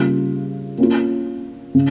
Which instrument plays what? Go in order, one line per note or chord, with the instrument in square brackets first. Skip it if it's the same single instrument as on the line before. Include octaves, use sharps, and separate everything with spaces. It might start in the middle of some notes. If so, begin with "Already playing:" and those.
Already playing: [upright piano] C#3 G3 A#3 F4
A#3 C#4 F4
C#3